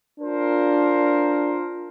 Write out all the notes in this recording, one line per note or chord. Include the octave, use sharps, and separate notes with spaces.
D4 F4 A#4 C5